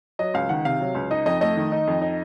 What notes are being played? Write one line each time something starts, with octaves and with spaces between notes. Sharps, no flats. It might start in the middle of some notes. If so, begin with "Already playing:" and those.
F#3 D#5
C#2 F5
D#3 F#5
C3 F5
F#3
C#2
D#4 D#5
F2 D#5
A3 D#5
D#3
D#4
F2
D#4